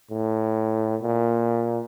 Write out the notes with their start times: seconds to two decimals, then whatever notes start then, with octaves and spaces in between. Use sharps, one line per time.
0.11 A2
1.02 A#2